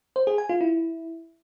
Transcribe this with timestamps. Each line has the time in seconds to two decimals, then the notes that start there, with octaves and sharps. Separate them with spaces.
0.16 C5
0.27 G#4
0.38 G#5
0.49 F4
0.61 E4